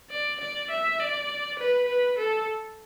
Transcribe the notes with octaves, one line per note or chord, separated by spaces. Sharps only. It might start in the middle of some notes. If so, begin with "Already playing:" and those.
D5
D5
E5
D5
B4
B4
A4